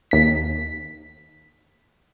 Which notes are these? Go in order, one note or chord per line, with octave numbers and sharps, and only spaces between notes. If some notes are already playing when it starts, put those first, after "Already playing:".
D#2 B6